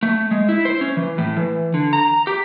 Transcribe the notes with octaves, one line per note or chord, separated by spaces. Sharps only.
A3
G#3
E4
C5
C#4
E3
A2
E3
D3
A#5
G4